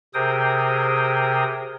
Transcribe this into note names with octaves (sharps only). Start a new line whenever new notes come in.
C3 G#4 A#4 C5 G5 D#6